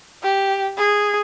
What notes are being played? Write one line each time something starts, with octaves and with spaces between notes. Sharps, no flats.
G4
G#4